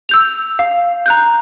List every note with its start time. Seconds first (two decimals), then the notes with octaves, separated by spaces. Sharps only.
0.09 E6 G6 F7
0.59 F5
1.06 A#5 F#6 G6